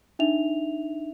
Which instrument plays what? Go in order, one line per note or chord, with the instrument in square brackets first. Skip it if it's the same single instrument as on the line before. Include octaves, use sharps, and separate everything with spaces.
[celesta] D4 D#4 E5 F7